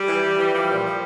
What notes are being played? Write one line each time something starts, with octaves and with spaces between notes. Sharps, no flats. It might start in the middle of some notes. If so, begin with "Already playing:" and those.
Already playing: G3
E3
E3
E3
F3 G3
A#2
F3